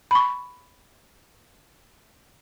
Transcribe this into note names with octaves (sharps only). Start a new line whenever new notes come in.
B5 C#6